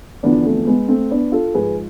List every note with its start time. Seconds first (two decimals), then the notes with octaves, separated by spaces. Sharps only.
0.23 E2 D3 F3 B3 D4
0.45 A3 C4
0.67 G#3 B3
0.88 A3 C4
1.11 B3 D4
1.32 F4 A4
1.54 G#2 F3 G#4 B4